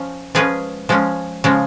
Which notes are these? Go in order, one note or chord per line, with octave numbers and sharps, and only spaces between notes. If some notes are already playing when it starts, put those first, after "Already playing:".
Already playing: F3 C#4
F3 G#3 C#4 G#4 B4
F3 G#3 C#4
C#3 F3 G#3